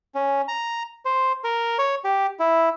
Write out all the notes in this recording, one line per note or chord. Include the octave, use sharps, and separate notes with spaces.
C#4
A#5
C5
A#4
C#5
G4
E4